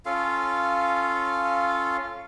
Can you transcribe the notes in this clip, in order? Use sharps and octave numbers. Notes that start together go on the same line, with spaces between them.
C#4 F4 A4 F5